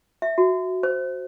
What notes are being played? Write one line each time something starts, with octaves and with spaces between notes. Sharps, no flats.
E5
F#4
C5